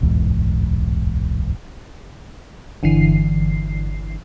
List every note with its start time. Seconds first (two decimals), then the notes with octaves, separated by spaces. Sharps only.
0.01 D1 B1 E2 G#2
2.83 G1 D3 E3 C7